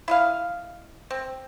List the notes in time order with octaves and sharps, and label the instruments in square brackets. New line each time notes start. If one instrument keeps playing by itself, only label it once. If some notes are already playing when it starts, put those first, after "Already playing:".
[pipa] E4 D#5 F5
C4